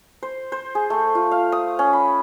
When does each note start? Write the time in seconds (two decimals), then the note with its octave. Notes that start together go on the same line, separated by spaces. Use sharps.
0.22 C5
0.52 C5
0.75 G#4
0.90 A3
1.15 F4
1.31 F5
1.52 D#6
1.79 C#4
1.93 B5